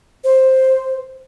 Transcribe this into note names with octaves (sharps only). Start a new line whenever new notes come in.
C5